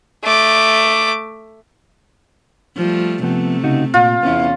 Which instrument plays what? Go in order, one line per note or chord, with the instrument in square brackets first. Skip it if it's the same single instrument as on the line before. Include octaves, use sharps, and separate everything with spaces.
[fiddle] A3 D6
[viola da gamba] F3 G3 A3
[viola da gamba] C3 A3 C4 [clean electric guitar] F3 B3
[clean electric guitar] C#3 D#4 F#4
[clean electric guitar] A#2 [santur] F4
[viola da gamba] E2 C#4 [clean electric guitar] B3 E4